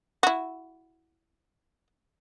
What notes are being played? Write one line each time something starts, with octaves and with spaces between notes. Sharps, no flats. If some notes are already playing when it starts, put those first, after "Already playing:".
E4 F#4